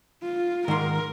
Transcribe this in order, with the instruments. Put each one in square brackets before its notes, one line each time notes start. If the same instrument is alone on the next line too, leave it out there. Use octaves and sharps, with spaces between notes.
[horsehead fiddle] F4
[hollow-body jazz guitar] G#2 C6 [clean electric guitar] D#3 [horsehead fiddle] A#4